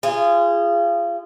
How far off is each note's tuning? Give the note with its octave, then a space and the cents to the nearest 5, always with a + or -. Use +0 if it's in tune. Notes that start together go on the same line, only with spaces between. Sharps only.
F4 -30 G#4 -15